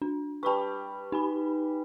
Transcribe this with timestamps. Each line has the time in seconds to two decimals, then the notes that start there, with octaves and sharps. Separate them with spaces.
0.02 D4
0.43 G3 B4 A5 B5 C#6
1.12 D#4 G#5 B5